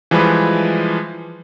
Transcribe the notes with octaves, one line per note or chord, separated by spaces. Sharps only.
E3 F3 G3 G#3 B4